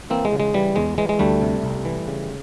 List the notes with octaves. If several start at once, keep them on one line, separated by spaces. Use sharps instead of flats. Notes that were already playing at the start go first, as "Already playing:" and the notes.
E3 A#3 C4
G#3
C#3
G#3
E3 G3
E2 G#3
E3 G#3
G#3
D2 G3 A3
C3
C2
E3
C#3